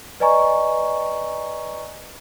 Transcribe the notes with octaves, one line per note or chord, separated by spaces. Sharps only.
B4 D5 D#5 G#5 A#5 C#6